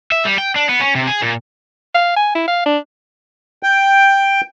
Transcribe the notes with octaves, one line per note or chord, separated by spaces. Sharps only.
E5
G3
G5
D4
B3
C#4
C3
G#4
A#2
F5
G#5
E4
F5
D4
G5